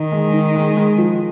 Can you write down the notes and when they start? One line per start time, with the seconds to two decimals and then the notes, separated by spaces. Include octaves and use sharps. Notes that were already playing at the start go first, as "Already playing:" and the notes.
Already playing: D#3 D#4
0.12 G#3
0.33 D#4
0.55 G#3
0.77 G#3
0.98 F3